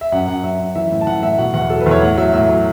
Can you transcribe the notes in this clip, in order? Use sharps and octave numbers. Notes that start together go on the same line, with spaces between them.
E5
F#2 F#5
F#2 F#5
F#2 E5
F#2
E3 E5
A2
A5
E3 F#5
A2 E5
B2 F#5
E2 F#5
F#3 A4
B4
E2
C#5
A2 F#5
F#3 E5
A2 E5
F#3